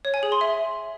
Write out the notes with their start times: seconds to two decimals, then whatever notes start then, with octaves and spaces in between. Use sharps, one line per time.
0.05 C#5
0.14 G#5
0.23 G#4
0.32 C6
0.41 E5